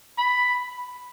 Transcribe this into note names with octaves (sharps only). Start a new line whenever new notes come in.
B5